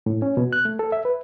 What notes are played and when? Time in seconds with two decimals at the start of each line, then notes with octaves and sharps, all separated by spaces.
0.06 A2
0.22 C#4
0.37 B2
0.53 F#6
0.65 A3
0.79 A4
0.92 E5
1.05 B4